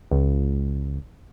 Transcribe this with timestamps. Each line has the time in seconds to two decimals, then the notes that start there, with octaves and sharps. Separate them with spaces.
0.11 C#2